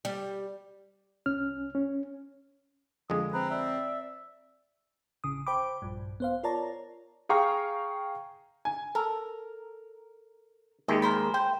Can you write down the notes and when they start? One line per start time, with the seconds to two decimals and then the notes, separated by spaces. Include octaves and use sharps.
0.05 G3
1.26 C2 C#4 F6
1.75 C#4
3.10 F2 D3 G#3 D#6
3.33 C4 B4 A#5
3.51 D5 E5
5.24 A1 C#3 D#6
5.47 C5 G5 B5 D6
5.82 A#1 G2
6.20 B3 C5 F5
6.43 F4 A#4 C#5 D5 A5 A#5
7.29 G#4 F5 G5 A#5 C#6 F6
8.65 G#5
8.95 A4 A#4
10.88 D#2 D#3 G#3 D#5 E5
11.02 A#4 C5 B5
11.34 C5 G5